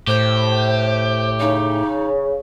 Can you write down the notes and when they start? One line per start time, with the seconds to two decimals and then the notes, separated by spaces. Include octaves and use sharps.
0.07 A2 G4 C5
1.40 C#3 D#4